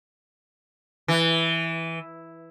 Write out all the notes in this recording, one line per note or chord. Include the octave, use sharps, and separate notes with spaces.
E3